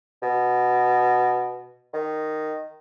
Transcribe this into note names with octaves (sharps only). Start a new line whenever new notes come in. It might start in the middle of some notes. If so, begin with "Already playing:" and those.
B2
D#3